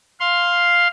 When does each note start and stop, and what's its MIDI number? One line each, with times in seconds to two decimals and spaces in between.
0.20 0.88 77
0.20 0.88 84